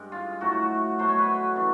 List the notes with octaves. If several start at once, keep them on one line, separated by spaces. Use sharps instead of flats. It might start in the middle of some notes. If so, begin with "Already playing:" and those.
Already playing: G2 G#3
F4
A2 F#3 A3 F#4
B2 F#3 A3 C5
C#5
B4
C#3 E3